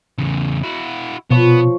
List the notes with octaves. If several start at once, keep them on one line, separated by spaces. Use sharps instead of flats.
E2 C#3
E4 F#4
B2 F3 B3 C#5